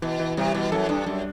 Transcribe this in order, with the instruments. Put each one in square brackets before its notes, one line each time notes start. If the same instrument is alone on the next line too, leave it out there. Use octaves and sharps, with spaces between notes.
[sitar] B2 [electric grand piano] E3
[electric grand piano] E3
[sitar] C3 [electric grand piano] G3
[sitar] B2 [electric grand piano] E3
[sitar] F#2 [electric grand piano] A4
[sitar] G2 [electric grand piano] D4
[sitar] F#2 [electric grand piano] G3